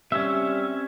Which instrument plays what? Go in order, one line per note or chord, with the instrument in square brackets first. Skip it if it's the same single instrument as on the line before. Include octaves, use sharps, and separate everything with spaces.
[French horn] G3 [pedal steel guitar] C4 C#4 [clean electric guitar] E5